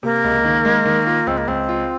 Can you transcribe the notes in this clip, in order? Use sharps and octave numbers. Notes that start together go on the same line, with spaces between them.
C3 A#3
C#2
D#3
G#3
D#3
F4
C#2 C4
A#3
C#2 C4
F4